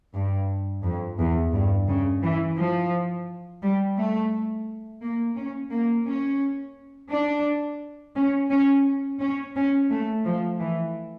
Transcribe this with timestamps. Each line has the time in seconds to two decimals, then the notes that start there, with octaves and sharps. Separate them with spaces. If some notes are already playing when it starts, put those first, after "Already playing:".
0.14 G2
0.84 F2
1.19 E2
1.53 G2
1.89 C#3
2.23 E3
2.58 F3
3.63 G3
3.98 A3
5.03 A#3
5.37 C#4
5.72 A#3
6.07 C#4
7.12 D4
8.17 C#4
8.51 C#4
9.21 C#4
9.56 C#4
9.91 A3
10.25 F3
10.60 E3